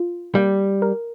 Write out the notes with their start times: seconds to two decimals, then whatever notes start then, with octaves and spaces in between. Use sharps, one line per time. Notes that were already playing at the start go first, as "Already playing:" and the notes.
Already playing: F4
0.35 G3 A#3
0.82 A#4